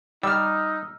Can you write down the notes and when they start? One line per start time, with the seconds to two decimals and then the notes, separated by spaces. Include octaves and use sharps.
0.23 G3 D#4 E6 F6